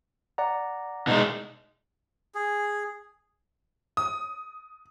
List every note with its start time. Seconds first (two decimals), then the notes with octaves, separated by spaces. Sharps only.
0.38 D5 F#5 A#5
1.07 B2 G#3 D#4
2.35 G#4
3.97 D#6